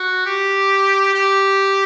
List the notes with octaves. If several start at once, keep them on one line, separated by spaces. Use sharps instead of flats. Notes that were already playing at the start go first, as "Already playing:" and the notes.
Already playing: F#4
G4
G4